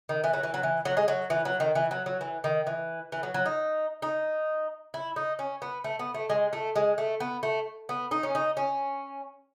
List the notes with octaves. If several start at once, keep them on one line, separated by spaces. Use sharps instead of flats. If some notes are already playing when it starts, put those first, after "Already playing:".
D#3
E3
F#3
E3
F#3
E3
F#3
G#3
F#3
E3
F#3
D#3
E3
F#3
F#3
E3
D#3
E3
E3
F#3
F#3
D#4
D#4
E4
D#4
C#4
B3
A3
B3
A3
G#3
A3
G#3
A3
B3
A3
B3
D#4
C#4
D#4
C#4